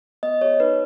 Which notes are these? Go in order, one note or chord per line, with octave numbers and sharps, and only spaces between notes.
B3 D#5
G4 C#5
D#4 B4